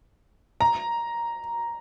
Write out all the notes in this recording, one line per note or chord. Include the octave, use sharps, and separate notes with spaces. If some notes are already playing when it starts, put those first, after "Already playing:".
A#5